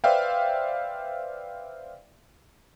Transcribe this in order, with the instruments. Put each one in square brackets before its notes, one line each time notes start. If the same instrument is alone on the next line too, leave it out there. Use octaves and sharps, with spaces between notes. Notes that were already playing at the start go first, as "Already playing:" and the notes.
[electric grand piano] B4 C5 D5 E5 F5 G5